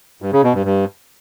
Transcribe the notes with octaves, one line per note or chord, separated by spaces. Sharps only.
G2
C#3
B2
G2
G2